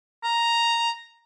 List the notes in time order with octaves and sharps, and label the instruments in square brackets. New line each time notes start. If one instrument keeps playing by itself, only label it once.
[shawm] A#5